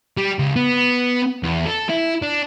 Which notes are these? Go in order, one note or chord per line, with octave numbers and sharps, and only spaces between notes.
G3
C#2
B3
E2
A4
E4
D4